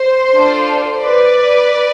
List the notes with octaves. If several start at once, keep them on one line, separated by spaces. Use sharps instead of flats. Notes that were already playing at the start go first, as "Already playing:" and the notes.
Already playing: C5
D4 F4 A4
B4 D5